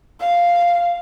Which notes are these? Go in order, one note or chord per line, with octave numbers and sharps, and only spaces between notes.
F5